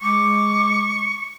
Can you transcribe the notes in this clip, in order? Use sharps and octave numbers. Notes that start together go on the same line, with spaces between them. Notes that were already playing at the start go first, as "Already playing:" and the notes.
G#3 C#6 D6